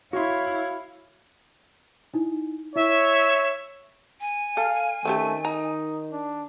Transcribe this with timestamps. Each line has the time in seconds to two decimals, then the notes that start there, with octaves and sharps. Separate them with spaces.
0.13 E4 F#4 C#5 F5 C6
2.14 D#4 E4
2.76 E4 C#5 E5
4.20 G#5
4.57 A4 F5
5.05 D#3 A3 C4 C#4 G4
5.45 D#4 A#5
6.12 D4